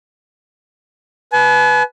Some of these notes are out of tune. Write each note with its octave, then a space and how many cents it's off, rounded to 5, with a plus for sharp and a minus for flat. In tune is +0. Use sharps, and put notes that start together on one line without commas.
B4 +0 G#5 +45